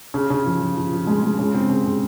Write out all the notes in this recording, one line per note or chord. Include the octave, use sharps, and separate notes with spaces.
C#3
C#3
F3
F3
F3
F3
G#3
G#3
C#3
C4
C#3
C#3